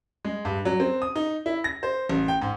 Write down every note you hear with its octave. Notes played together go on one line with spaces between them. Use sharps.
G#3
G2
F#3
C4
D#6
D#4
E4
A#6
C5
A1
G5
G#2